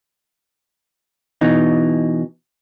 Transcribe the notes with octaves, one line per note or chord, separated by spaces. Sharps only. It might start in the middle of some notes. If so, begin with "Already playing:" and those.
B2 E3 D#4